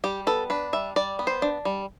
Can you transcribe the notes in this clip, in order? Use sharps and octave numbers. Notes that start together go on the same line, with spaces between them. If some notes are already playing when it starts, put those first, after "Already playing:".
G3 G4
B3 A4
D4 B4
G3 E5
G3 D5
B3
C5
D4
G3